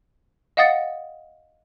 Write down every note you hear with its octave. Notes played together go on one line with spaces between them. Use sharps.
D#5 F5 F#5 D#6 A6 C#7